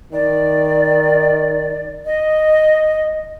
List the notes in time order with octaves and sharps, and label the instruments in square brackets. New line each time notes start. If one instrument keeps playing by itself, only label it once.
[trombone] D#3 [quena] D5
[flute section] D#5